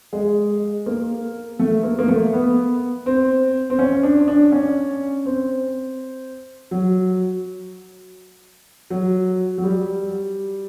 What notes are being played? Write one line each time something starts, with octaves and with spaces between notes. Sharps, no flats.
G#3
A#3
A3
A#3
A#3
A3
B3
C4
C4
C#4
D4
D4
C#4
C4
F#3
F#3
F#3
G3